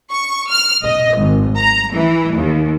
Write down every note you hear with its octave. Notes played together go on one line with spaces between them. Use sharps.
C#6
F6
D#5
G#1
A#5
E3
D#2